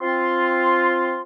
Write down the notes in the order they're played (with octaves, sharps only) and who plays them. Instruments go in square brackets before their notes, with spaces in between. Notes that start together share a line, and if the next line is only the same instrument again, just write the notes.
[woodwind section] C4 F4 C6